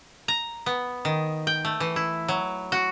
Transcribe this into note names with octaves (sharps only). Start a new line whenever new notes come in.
A#5
B3
D#3
G5
A3
E3
E4
F#3
F#4